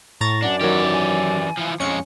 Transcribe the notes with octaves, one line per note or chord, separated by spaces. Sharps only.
A2 A#5 C#6 A6
F#2 D4 D5 F#5
D#3 E3 F#3 G4 A#4
G#5
E3 F3
F2 G#3 C#4 C#7